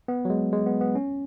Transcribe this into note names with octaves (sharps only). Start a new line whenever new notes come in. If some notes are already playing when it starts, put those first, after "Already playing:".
B3
F#3
G#3
G#3
B3
B3
C#4